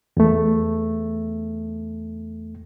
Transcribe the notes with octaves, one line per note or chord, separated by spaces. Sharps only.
E2 A3